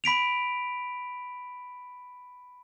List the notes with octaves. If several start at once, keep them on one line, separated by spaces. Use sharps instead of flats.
B5 B6 D7 F7